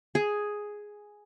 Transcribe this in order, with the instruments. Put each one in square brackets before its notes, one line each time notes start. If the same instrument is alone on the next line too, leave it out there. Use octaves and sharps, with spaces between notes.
[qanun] G#4